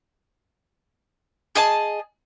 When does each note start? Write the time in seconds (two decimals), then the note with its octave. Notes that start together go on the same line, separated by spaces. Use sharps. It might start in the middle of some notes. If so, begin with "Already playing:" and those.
1.55 G#4 D#5 A5